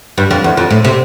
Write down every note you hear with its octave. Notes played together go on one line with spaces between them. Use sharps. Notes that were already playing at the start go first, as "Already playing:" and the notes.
G2
F2
E2
F2
A2
C3